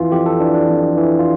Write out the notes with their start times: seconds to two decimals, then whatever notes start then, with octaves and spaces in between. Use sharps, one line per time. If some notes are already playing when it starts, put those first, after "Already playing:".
Already playing: F2 E3 F4
0.12 F2 G4
0.26 A4
0.40 E3 D4
0.54 D4
0.69 F2
0.97 E3
1.19 F4